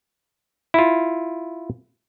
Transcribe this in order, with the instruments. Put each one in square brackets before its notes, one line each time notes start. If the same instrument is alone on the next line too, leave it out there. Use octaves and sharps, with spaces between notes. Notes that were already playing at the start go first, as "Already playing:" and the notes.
[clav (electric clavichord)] E4 F4